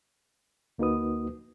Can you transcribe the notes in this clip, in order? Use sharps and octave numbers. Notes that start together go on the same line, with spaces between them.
D2 A#3 D#4 F#4 B4 D#6